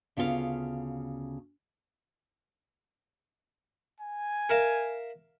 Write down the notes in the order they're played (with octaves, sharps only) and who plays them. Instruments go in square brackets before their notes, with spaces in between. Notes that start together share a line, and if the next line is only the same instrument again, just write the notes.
[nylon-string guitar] D2 C#3 B3 F4 A4 F5
[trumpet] G#5
[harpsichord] A#4 E5 F5